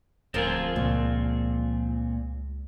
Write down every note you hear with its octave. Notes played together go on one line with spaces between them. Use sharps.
D1 F3 C4 F4 G#4 A#4
C#2 A#2